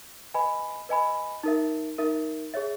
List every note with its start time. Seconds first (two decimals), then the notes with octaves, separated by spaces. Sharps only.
0.34 B4 D#5 G#5 B5
0.89 B4 D#5 G#5 B5
1.43 D#4 A#4 E5
1.98 D#4 A#4 E5
2.54 G#4 C#5 E5